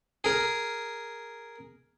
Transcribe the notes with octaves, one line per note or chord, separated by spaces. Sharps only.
G#4 A#4